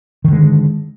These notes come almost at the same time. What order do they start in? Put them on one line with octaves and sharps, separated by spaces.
D#3 D3 G#3